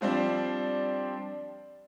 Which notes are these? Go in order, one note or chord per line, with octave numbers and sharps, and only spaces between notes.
F3 G3 C4 D4